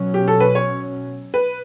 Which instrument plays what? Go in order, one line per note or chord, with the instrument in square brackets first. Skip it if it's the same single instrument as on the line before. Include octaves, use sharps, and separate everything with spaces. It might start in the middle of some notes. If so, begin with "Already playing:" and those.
Already playing: [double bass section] B2 F#3 C#4
[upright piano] G4
A4
B4
C#5
B4